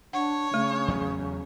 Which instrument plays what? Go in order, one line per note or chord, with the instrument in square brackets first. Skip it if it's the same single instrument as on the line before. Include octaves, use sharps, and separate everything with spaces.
[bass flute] D4 [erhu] C#5 [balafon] F#5
[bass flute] C#3 [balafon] A3
[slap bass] E2 F#3 C#4